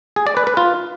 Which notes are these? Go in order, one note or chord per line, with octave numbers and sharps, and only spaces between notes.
G#4
D5
B4
B4
F4